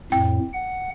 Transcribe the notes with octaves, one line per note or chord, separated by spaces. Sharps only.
F2 A2 G5
F#5